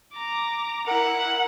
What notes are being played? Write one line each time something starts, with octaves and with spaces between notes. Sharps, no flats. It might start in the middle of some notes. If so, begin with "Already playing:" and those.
A#5 D6
E4 A#4 F#5